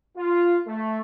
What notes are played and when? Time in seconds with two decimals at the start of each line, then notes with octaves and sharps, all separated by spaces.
0.17 F4
0.67 A3